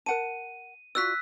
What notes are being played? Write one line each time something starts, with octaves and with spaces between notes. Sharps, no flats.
A#4 F#5 A5 D#7
F4 F#4 D5 E6 F#6 B6